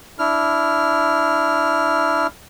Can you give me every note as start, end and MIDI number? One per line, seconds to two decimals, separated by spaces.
0.19 2.27 62
0.19 2.27 64
0.19 2.27 89